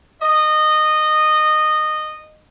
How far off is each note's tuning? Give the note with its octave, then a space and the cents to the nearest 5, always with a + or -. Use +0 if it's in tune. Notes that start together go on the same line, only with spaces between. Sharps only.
D#5 -15